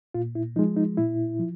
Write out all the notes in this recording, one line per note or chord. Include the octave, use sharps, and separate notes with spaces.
A#2 F4
E4
F3 G#3 D#4
D#4
A#2 E4
F3